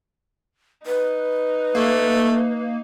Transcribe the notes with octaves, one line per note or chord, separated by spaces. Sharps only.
D#4 B4
A3 A#3